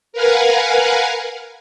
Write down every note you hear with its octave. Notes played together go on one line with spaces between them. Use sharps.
A#4 B4 F5 F#5 G#5